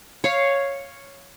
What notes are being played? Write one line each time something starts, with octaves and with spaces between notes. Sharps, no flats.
C#5 F5